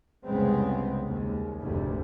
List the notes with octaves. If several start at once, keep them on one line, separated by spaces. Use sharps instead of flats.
C2 F2 C#3 G#3 B3 C4
D#2 G#3
F1 D2 G#2 C3